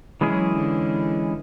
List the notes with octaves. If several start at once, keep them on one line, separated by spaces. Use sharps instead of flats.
E3 F#3 G#3 C#4 E4 G#4
D3